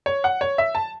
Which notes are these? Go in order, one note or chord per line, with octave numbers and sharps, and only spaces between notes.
C#5
F#5
C#5
E5
A5